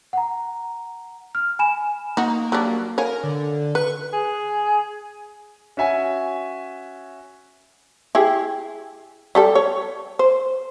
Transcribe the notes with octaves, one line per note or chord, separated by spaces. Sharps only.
F#5 A#5
F6
G#5 B5 E7
A#3 D#4 F#4
F#3 G3 D4
A#4 C#5 F5 G#5
D3
B4 C#6
G#4
C#4 F#4 E5 G#5
E4 G4 G#4
G3 G4 A4
C#5
C5